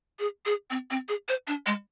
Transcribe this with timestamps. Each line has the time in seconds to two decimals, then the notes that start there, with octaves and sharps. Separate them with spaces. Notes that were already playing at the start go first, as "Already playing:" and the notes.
0.19 G#4
0.46 G#4
0.70 C4
0.90 C4
1.08 G#4
1.28 C5
1.47 D4
1.66 G#3